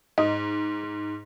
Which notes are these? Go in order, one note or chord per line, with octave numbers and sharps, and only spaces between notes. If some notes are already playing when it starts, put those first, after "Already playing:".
G#2 D#5